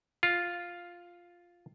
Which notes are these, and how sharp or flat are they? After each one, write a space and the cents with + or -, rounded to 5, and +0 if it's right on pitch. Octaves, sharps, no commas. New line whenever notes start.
F4 +0